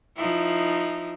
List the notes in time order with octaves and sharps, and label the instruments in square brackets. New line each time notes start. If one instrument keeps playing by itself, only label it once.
[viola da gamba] F3 D#4 E4